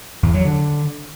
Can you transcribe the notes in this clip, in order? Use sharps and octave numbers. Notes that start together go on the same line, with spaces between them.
E2
F#3
D3